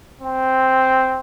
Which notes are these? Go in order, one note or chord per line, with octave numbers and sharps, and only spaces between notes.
C4